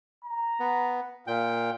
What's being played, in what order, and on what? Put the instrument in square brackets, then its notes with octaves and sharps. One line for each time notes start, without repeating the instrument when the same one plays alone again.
[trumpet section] A#5
[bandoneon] B3
[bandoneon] A#2 G5 [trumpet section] F5